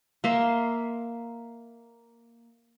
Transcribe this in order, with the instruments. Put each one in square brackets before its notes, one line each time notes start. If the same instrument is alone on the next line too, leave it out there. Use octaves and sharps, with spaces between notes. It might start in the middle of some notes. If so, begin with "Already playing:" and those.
[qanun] A#3 E5 C6